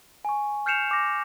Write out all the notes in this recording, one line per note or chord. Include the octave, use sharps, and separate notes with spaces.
G#5 C#6
F6 G6 C7 C#7 E7 F7
D6 A#6